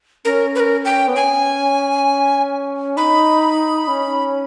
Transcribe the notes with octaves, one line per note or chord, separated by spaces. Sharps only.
C#4 A#4
B4
A#4
G5
B3
C#4 G#5
D#4 B5
C#4